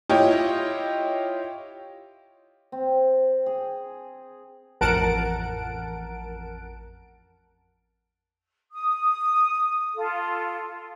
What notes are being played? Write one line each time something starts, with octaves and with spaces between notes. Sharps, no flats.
E4 F4 G4 C#5 D#5
C4
G#4
A1 F2 A#4 F#5 A5 D7
D#6
F4 A4